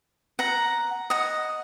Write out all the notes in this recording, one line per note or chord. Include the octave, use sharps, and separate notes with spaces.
F#5 A#5
D#5 F#5